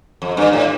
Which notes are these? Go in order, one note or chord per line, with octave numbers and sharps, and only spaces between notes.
F2
G2
A2